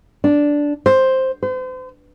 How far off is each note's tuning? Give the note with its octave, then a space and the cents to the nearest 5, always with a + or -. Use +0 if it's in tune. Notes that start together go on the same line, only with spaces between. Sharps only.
D4 -5
C5 +5
C5 -40